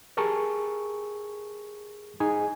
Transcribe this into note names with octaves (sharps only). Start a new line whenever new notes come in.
G4 G#4 A#4 A5 C#6
D#4 G#4 D#5 G#5